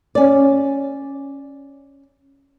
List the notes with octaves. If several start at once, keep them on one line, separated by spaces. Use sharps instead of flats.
C#4 D5